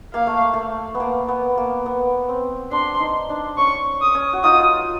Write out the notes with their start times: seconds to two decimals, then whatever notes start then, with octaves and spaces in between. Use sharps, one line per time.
0.14 A#3 F5
0.27 A3
0.54 A3
0.95 B3
1.00 A#3
1.28 B3
1.57 A#3
1.86 B3
2.29 C4
2.72 D4 C6
3.00 D#4
3.30 D4
3.58 C#4 C#6
4.01 D#6
4.15 C#4
4.33 F#4
4.44 D#4 F4 D#6